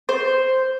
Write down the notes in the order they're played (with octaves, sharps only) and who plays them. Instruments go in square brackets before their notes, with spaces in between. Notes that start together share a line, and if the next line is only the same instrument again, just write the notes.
[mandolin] C5